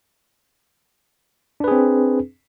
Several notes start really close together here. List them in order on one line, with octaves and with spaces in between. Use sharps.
D4 B4 G#4 C4